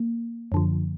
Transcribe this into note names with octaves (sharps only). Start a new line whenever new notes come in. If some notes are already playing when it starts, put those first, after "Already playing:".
Already playing: A#3
F#2 D3 F3